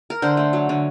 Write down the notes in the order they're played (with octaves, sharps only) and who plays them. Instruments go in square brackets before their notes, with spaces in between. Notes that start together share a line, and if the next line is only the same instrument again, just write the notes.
[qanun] A#4
D3 C5
A3
F#3
D3